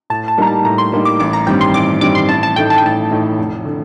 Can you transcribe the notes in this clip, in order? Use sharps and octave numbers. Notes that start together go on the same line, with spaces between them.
A2 A5
A5
G3 A#3 D#4 A#5
A5
A2 A#5
C6
G3 A#3 D#4
D6
A1 D6
A#5
G2 D#3 G3 C4 G5
C6
A1 D6
G2 D#3 G3 C4 D6
C6
A1 A5
A5
A2 A3 D#4 G5
A5
G5
A1 A5
A2 A3 D#4
F1
D3